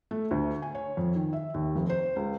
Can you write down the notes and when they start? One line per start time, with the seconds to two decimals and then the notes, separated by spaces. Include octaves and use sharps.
0.11 A3
0.31 D2
0.62 G#5
0.75 C#5
0.97 F2
1.15 D#3
1.33 E5
1.54 D#2
1.76 F1
1.90 C5
2.16 C#2